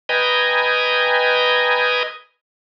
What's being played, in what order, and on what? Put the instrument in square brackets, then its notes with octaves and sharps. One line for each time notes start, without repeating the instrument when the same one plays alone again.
[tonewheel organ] B4 D#5 G5 G#5 A#5